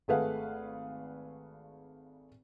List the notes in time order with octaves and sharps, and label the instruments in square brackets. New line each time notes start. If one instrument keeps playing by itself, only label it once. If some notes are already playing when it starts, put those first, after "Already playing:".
[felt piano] G#1 A3 G#4 B4 F5 F#5